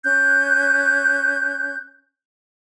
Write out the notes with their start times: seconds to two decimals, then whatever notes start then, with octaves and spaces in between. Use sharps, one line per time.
0.05 C#4 F#6 G6